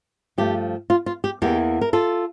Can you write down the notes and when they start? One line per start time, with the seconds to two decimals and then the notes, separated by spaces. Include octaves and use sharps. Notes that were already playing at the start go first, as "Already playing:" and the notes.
0.38 G2 F3 A3 G4
0.90 F4
1.06 F4
1.24 G4
1.42 E2 E3 A#3 E4 G4
1.81 A#4
1.93 F4 A4